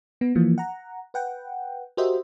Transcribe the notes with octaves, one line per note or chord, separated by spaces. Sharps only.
B3
E3 F3 A#3
F#5 A#5
B4 F#5 G5
F#4 G4 A#4 C5 D#5 E5